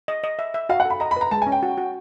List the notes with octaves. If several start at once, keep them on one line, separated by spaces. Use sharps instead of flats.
D#5
D#5
E5
E5
F#4 F5
F#5
A4
B5
D#5 A#5
B5
B4 A#5
G#3 A5
G#5
C#4
G5
F#4
F#4